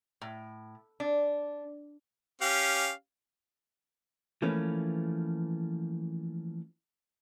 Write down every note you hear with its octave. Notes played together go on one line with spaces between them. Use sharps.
A2
D4
C#4 G4 F5
E3 F3 A3 A#3 C#4 B4